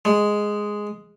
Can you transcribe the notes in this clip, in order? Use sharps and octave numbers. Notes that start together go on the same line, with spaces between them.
G#3